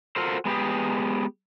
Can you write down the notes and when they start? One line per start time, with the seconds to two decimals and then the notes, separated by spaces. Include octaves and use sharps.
0.16 F4 F#4 A4 A#4 C5
0.45 G#3 B3 G4 G#4